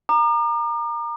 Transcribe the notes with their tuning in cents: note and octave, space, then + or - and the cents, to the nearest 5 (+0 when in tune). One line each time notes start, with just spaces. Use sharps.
A#5 +0 D6 +45